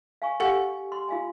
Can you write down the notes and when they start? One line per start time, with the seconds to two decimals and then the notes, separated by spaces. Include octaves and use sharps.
0.22 F5 G#5 C#6
0.40 G4 A4 F5 F#5 G#5
0.92 C6
1.09 F4 F5 G#5